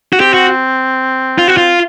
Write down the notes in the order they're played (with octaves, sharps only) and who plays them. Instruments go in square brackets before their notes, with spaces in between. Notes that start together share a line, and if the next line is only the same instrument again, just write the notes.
[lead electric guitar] F#4
[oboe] C4 [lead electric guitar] G4
[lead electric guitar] F#4
F4
F#4
F4